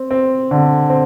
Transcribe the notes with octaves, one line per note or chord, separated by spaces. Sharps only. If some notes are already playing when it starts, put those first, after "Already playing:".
Already playing: C4
C4
D3
C4